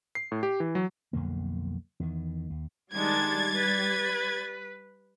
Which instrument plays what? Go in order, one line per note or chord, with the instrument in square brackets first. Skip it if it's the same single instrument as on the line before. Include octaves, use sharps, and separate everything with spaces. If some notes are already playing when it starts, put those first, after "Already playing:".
[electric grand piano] C7
A2
G4
E3
F#3
[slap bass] B1 F2 D3 A#3
E2 D#3
D#2
[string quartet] D#3 G#3 D4 [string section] G3 G#6 A6
[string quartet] B4